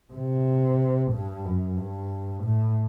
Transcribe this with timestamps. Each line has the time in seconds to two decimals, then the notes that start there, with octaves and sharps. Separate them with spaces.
0.13 C3
1.12 G2
1.45 F#2
1.77 G2
2.44 A2